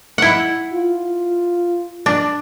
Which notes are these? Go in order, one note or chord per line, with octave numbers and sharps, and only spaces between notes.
E4 F#5
F4
D4